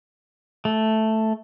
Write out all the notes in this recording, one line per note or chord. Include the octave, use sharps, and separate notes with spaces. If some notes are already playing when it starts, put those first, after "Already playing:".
A3